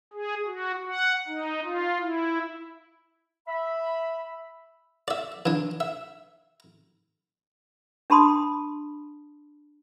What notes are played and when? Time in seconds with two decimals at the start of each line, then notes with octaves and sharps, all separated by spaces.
0.13 G#4
0.46 F#4
0.88 F#5
1.27 D#4
1.64 F4
2.01 E4
3.48 E5 B5
5.08 D5 E5
5.46 E3 D4
5.80 E5
8.10 D4 G4 A5 B5 C6 D#6